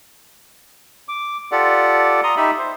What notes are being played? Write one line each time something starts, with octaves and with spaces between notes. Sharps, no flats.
D6
F4 G4 A4 D5 F#5
A#5 C6 D#6
D#4 G4 E5 B5
C5